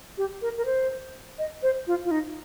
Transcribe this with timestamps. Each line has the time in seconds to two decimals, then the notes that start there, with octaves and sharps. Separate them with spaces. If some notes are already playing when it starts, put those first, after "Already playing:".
0.18 G4
0.42 A#4
0.57 A#4
0.66 C5
1.39 D#5
1.63 C5
1.87 F4
2.05 F4
2.11 D#4